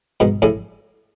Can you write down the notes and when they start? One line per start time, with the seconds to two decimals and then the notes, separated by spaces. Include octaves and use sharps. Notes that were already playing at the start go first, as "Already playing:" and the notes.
0.20 G#2 B2
0.42 A2 C#3